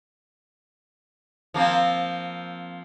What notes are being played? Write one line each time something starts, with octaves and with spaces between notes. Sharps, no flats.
F3 A#3 C4